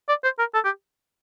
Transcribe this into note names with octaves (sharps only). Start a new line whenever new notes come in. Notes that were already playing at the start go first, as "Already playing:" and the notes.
D5
C5
A#4
A4
G4